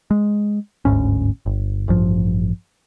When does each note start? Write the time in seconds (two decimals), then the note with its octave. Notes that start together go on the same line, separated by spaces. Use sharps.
0.11 G#3
0.85 G1 D2 G#2 C#4
1.46 G1
1.88 A1 G2 F3